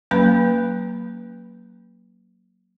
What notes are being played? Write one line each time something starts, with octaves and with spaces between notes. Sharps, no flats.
F#3 A#3 C#4 B4 B5